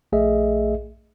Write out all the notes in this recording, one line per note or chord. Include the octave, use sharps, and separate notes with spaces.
A#1 A3 G#4 D#5 E5